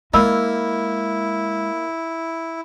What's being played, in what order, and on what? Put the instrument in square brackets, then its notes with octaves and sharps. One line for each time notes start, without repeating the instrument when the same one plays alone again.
[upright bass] G#3 [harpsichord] A#3 [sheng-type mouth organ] E4 [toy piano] D#5 B5 E6